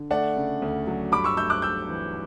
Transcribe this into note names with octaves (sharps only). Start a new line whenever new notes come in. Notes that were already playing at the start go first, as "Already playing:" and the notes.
Already playing: D3
A3 D5 F#5
C#3
D2
F#3
G2 B5 D6
C#6 E6
A3 E6 G6
D6 F#6
A3 E6 G6
E3